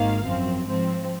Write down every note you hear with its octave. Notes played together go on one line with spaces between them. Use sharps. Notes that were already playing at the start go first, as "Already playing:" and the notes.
Already playing: G#1 G#2 D#3 A#3 F5
F#2 F3 C4
G#2 F3 C4